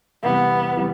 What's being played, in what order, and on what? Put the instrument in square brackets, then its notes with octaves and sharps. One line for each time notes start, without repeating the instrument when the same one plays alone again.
[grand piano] E2 C3 E3 G3 [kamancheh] B3
[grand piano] C3 E3 G3